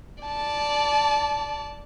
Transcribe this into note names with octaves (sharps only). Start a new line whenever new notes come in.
D5 A5